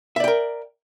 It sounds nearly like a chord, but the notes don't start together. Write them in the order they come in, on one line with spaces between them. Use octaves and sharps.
E5 D5 G5 A#4